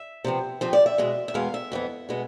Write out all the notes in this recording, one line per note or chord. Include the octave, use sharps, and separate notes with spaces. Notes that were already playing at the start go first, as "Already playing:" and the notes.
Already playing: E5
C3 F3 B3
C3 F3 A3 C4
D5
E5
E2 B2 G#3
E5
E2 B2 G#3 B3 F5
E5
F2 E3 B3
B2 G#3 B3